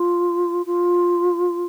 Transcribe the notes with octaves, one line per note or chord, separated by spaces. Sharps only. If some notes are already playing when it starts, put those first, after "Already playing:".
Already playing: F4
F4